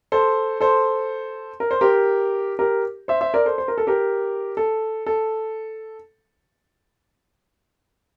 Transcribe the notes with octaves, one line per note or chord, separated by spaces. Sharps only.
A4 C5
A4 C5
A#4
C5
G4 A#4
G4 A#4
C5 E5
C5 E5
A#4 D5
A4 C5
C5
A#4
A4
G4 A#4
A4
A4